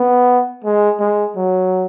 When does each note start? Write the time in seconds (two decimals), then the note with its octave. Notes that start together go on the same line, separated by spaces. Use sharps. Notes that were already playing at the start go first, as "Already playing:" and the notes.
Already playing: B3
0.65 G#3
1.00 G#3
1.36 F#3